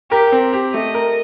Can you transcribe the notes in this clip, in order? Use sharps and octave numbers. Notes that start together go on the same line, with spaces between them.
G4 A#4
C4
G4
A3 D#5
A#4